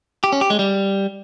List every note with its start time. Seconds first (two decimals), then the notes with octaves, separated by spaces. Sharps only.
0.24 G4
0.32 C#4
0.41 G4
0.50 G#3
0.59 G3